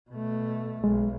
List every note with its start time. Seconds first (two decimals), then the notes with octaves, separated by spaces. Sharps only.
0.11 B2 A3
0.84 B1 G#3